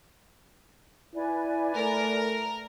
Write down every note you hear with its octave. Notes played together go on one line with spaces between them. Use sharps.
E4 B4 D5 G#5
A3 A#4